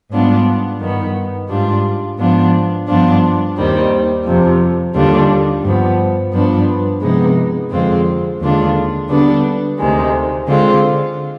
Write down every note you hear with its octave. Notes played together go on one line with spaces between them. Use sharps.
G#2 G3 B3 D4 F4
G2 D#3 B3
G#2 G3 D4 F4
G#2 F3 B3 D4 F4
G2 F3 B3 D4 F4
D#2 D#3 G3 C4
F2 C3 F3
D#2 D3 G3 D4 F4
G2 F3 B3
G2 F3 B3 D4
C3 F3 G#3 B3 D#4
F2 D3 G#3 C4 F4
D#2 D3 G#3 D4 F4
D3 G3 B3 D4
D2 C3 D#3 G#3
D3 G#3 C4 F4